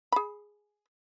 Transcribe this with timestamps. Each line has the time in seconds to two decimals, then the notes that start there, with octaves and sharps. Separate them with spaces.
0.12 G#4 B5